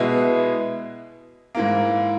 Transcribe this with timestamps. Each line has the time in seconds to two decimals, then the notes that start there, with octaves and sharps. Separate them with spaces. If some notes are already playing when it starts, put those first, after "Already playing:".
Already playing: B2 G#3 B3 E4
1.55 G#2 E3 A#3